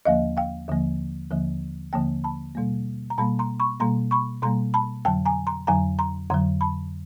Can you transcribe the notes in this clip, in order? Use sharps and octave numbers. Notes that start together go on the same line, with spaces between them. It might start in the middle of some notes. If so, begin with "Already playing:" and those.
D#2 D3 F3 A#3 D#5 F5
F5 G5
D#2 D3 F3 A#3
D#2 D3 F3 A#3
D#2 D3 F3 A#3 G5 A5
A5 B5
B2 G3 A#3
A#5
B2 G3 A#3 A5 B5
A#5 C6
B5 C#6
B2 G3 A#3 A#5 C6
B5 C#6
B2 G3 A#3 A#5 C6
A5 B5
F2 D3 F#3 G5 A5
G#5 A#5
A#5 C6
F2 D3 F#3 G#5 A#5
A#5 C6
F2 D3 F#3 A#5 C6
A5 B5